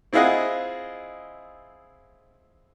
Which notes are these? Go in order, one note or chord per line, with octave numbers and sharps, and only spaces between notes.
C4 E4 F4 G#4 D#5 F#5